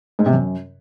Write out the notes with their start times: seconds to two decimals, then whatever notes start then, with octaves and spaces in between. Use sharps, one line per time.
0.19 G#2
0.26 C3
0.33 F#2